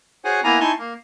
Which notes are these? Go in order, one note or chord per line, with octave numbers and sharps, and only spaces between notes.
F#4 G#4 C5 C#5 F#5 G#5
A#3 B3 E4 G#5 A#5
D#4 E4 G#5 A5 C6 C#6
A#3